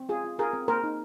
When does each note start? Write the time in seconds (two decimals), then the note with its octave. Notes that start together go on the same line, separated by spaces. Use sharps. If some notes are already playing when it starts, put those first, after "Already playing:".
Already playing: C4
0.09 F4 G#4
0.24 F4
0.39 F4 G#4 A#4
0.53 C4
0.68 A#3 A#4 C5
0.84 D#4